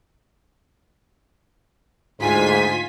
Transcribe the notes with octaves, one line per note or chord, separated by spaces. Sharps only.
D2 G#2 F4 G#5 B6